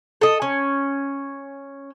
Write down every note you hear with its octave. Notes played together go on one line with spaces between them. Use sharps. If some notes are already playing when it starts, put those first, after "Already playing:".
A4 D#5
C#4